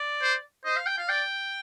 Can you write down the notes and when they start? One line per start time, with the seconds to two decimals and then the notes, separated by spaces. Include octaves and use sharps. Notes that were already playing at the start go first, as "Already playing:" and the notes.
Already playing: D5
0.22 C5
0.65 C5 D#5
0.76 F5
0.87 G5
0.98 F5
1.09 D5 G5